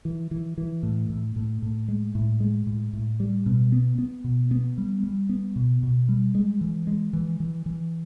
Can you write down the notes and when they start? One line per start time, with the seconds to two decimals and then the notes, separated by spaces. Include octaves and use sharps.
0.05 E3
0.31 E3
0.58 E3
0.83 A2
1.10 A2
1.36 A2
1.62 A2
1.88 G#3
2.15 A2
2.40 G#3
2.67 A2
2.93 A2
3.20 G3
3.46 B2
3.72 B3
3.98 B3
4.24 B2
4.51 B3
4.78 G3
5.03 G3
5.29 B3
5.56 B2
5.83 B2
6.09 G3
6.35 G#3
6.61 E3
6.87 G#3
7.13 E3
7.40 E3
7.66 E3